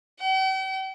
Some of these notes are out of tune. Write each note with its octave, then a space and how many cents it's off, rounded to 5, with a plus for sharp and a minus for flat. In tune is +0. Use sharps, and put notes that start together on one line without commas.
G5 -45